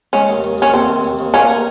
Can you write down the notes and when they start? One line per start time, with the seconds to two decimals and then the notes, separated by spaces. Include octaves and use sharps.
0.13 G#3 C#4
0.29 D#2
0.44 D#2
0.58 D#2 C#4
0.74 D#2 C4
0.88 D#2
1.04 D#2
1.19 D#2
1.34 A#3 C#4
1.49 A#4